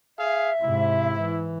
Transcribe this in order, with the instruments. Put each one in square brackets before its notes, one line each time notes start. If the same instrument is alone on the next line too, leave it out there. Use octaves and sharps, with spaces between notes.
[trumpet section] G#4 F5 [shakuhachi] E5
[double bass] G#2 C3 [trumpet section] E4
[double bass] E3